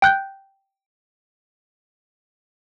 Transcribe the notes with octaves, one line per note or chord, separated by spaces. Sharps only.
G5 F#6 G6